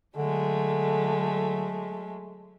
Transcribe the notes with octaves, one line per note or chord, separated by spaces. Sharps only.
D3 F#3 G#3 A3